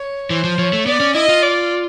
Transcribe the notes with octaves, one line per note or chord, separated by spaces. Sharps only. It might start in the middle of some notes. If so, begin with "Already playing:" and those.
Already playing: C#5
E3 C5
F3
F3 C#5
A3
B3 D5
C#4
E4 D#5
F4
D5